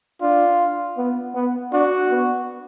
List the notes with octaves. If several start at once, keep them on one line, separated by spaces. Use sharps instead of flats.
D4 F4
B3
B3
D4 F#4
B3